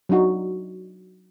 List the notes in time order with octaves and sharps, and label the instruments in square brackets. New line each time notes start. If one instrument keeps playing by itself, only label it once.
[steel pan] F#3 D4 D#4 F#4